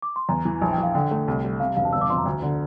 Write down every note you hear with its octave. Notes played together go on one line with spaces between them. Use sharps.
D6
C6
E2 A#5
E3
A#1 A5
G5
A#1 F5
D3 G5
A3
C2
G3
C3 F5
E1 F5
A5
G1 E6
D6
F2 C6
A#5
D2
D3